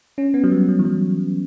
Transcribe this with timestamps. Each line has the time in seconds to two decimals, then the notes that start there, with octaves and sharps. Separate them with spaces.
0.18 C#4
0.34 B3
0.44 F#3
0.52 G3
0.68 F#3
0.79 E3
0.85 F#3